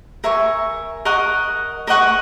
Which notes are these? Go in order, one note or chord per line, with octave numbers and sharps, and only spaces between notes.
A#4 E5 G#5 C#6
A#4 D#5 F#5 C#6
A#4 D#5 F#5 C#6